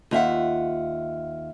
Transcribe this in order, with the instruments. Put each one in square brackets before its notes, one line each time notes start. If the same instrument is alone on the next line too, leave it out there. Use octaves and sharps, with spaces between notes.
[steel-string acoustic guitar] D#2 F4 E5 F#5